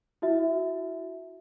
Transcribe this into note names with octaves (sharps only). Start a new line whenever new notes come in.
E4 F#4 E5